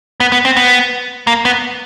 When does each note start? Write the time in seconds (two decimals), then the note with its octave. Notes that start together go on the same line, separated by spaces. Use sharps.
0.20 B3
0.32 B3
0.45 C4
0.57 B3
1.27 A#3
1.45 B3